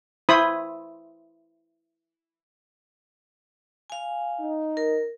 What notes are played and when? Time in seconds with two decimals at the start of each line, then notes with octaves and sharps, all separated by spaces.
0.29 E4 C5 B5 D#6
3.90 F5 G#5
4.40 D#4
4.77 A#4